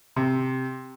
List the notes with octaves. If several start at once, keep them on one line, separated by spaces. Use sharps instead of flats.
C3